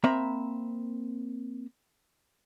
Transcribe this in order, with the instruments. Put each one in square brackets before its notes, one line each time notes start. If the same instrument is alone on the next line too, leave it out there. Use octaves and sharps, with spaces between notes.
[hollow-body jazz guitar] A#3 C4 E5 A#5 B5